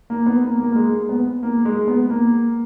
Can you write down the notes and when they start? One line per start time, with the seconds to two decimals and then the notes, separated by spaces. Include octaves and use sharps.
0.10 A#3
0.26 B3
0.43 A#3
0.60 A#3
0.72 A#3
0.76 G#3
1.09 B3
1.43 A#3
1.65 G#3
1.88 B3
2.10 A#3